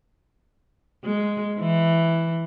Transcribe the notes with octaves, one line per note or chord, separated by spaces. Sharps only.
G#3
E3